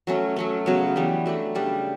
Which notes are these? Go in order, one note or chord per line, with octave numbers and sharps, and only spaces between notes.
F#3 A3 C#4
F#3 A3 C#4
C#3 F#3 B3
E3 G3 B3
F#3 A3 D4
C#3 G3 D4